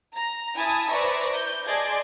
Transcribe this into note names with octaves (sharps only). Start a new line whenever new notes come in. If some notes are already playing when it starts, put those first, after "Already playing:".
A#5
E4 G#5 A5 D#6
B4 C5 D5 E5 A#5 C#6
G6
G#4 D5 D#5 A5 C6 G#6